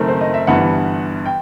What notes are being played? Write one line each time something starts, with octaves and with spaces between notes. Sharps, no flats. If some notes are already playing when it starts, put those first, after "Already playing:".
Already playing: F#1 F#2 D#3 A3 C4
C5
D#5
E5
G1 G2 E3 B3 F#5
G5